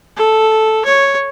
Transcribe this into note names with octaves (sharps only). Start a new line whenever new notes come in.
A4
C#5